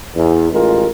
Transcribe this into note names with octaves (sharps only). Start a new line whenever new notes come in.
E2
A1 G#3 F4 A#4